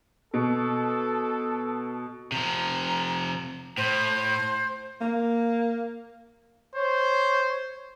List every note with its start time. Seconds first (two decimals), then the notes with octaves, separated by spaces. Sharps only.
0.34 B2 A4
2.32 C3 F3 A#5
3.78 A2 C5
5.01 A#3
6.76 C5 C#5